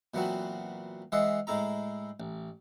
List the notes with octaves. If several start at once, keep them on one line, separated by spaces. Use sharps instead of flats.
A#2 E3 F#3 B3 C4 F#4
E3 G#3 D#5 E5 F#5 C6
A2 G#3 E4 A4 A#5
A1